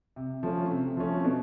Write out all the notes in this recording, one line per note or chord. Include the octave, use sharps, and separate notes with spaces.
C3
F3 A3 C#4
C3
F3 A3 C#4
B2